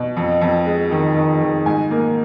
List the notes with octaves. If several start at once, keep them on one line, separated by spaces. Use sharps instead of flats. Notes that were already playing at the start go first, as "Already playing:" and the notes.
Already playing: B2
F2
F2
G#3
D#3
D#3
D#3
G#2 G#5
A#3